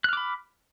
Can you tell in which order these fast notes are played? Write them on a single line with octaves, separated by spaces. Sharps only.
F#6 F6 D6 B5